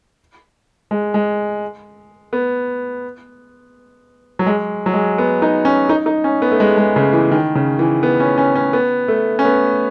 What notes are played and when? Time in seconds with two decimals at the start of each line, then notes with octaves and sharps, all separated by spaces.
0.91 G#3
1.14 G#3
2.33 B3
4.39 F#3
4.46 G#3
4.86 F#3
4.93 G#3
5.18 B3
5.42 D#4
5.65 C#4
5.89 D#4
6.06 D#4
6.24 C#4
6.42 B3
6.52 A3
6.60 G#3
6.77 G#3
6.96 C#3
7.13 E3
7.32 D#3
7.55 C#3
7.79 E3
8.03 B3
8.20 C#4
8.38 C#4
8.55 C#4
8.73 B3
9.08 A3
9.39 C#4
9.45 B3